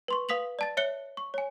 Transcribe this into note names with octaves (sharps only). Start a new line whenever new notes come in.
B4 C6 C#6
B4 F5 D#6 B6 F7 F#7
D5 A5 A6
C#5 E5 F#6 C#7 G7
C#6
C#5 G#5